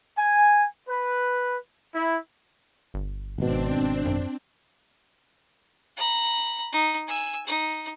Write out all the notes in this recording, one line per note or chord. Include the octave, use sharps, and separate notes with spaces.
G#5
B4
E4
G1
G#1 B2 C4 D4
F#2
A#5 B5
D#4
G#5 E6
D#4